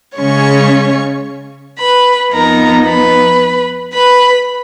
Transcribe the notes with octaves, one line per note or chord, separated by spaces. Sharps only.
C#3 G#3 C#4 C#5 C#6
B4 B5
F2 F3 B3 D#4 A#4 A#5
B4 B5
B4 B5